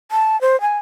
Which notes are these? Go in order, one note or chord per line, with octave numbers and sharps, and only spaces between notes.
A5
C5
G#5